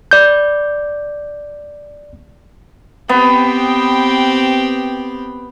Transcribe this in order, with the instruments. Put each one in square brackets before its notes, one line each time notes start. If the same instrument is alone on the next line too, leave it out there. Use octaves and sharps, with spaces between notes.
[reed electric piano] D5 G6
[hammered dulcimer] B3 [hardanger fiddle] C4 G4